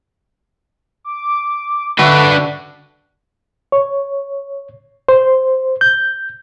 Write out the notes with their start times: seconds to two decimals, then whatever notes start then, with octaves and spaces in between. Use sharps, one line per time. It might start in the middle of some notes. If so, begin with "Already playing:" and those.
1.04 D6
1.99 D3 D4 F#4 B4 E5
3.72 C#5
5.09 C5
5.81 G6